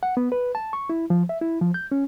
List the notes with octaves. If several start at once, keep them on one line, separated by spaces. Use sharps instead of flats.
F#5
B3
B4
A5
C#6
E4
F3
E5
E4
F3
G6
C#4